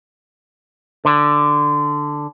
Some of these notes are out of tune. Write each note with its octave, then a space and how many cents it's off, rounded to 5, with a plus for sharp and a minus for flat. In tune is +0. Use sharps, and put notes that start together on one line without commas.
D3 +5